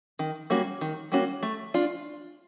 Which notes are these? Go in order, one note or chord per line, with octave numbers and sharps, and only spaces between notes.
D#3
G3 A#3 C#4 F#4
D#3
G3 A#3 C#4 F#4
A3
D4 F4